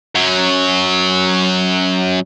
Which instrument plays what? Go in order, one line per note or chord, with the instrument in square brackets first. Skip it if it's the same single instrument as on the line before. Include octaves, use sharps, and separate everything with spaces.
[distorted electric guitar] F#2 F#3